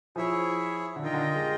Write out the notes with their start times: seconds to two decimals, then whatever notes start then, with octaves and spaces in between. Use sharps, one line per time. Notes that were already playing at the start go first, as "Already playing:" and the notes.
0.16 F3 E4 G#4 C#5 E5
0.96 D3
1.03 D#3 F4 A#4 D#5 G5
1.14 D3
1.36 G#3